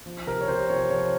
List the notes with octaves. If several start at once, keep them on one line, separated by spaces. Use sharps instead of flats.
F3
C3 A#4
C#5
C3 C5
F3 C#5
F3 C#5